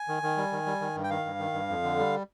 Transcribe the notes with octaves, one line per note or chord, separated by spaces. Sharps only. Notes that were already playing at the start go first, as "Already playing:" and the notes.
Already playing: G#5
D#3
D#3
G3
D#3
G3
D#3
G2
G5
D#3 F5
G2
D#3
G2
F2
D3
G3